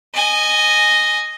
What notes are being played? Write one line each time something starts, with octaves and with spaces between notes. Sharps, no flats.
D#5 G#5